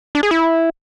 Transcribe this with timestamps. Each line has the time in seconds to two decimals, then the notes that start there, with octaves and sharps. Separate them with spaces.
0.15 D4
0.23 G#4
0.31 E4